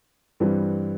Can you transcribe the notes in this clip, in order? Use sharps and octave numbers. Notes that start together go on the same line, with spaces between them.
G2 E3 G3 C4